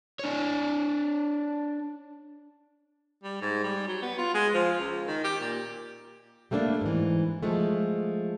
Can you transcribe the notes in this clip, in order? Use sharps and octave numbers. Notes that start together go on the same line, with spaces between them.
D4 C#5
G3
G#2
G3
F#3
B3
F4
G#3
F3
C#2
D#3
G4
A#2
G3 A3 A#3 C4 D4
G#2 E3
F3 G#3 A3